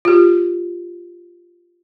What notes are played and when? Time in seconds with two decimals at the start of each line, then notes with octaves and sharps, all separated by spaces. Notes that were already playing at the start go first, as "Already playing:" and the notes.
0.05 F4 G4